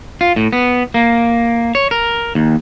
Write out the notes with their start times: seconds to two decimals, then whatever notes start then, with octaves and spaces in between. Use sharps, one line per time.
0.21 F4
0.36 A2
0.53 B3
0.94 A#3
1.75 C#5
1.91 A#4
2.35 D#2